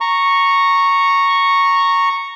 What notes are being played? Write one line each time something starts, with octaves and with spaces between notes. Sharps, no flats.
A#5 C#6